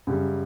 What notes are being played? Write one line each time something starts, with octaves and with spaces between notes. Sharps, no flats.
F#2 C#3 G3